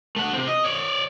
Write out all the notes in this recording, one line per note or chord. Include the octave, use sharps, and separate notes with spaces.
A3 F#5
C3 C4
D#5
C#5 D5